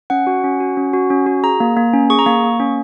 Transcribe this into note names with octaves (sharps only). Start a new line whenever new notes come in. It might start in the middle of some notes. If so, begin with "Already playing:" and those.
C#4 F#5
F#4
C#4
F#4
C#4
F#4
C#4
F#4
G#4 A#5
A#3
A#3
C#4
G#4 C#6
A#5
A#3 C#6
A#3
C#4